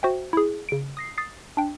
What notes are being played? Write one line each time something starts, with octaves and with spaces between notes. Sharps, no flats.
F#4 C5 E5 G5
E4 G#4
C#3 D7
D#6 A#6 C7
D#6 A6 C7
D4 G5